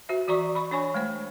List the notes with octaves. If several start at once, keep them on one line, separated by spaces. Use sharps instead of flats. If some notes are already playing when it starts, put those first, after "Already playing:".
F#4 C5 E5
E3 F#4 D5 A#5 C#6
B5 C#6
D4 C#5 G#5 C#6
G#3 A3 C5